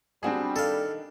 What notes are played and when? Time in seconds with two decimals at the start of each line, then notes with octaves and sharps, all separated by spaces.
0.23 B2 G3 C4 D4 F#4 G#4
0.56 D#3 D4 A4 F5